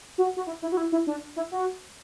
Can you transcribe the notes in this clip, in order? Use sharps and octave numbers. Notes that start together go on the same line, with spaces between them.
F#4
F#4
E4
E4
F#4
E4
E4
D4
E4
F#4